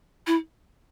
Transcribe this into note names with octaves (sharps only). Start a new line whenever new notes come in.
E4